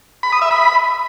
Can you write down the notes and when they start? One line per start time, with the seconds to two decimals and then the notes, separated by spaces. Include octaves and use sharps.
0.23 B5
0.32 D#6
0.42 E5
0.51 B5